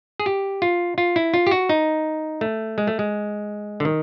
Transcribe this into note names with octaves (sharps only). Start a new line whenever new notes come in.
G#4
G4
F4
F4
E4
F4
G4
F#4
D#4
A3
G#3
A3
G#3
D3
D#3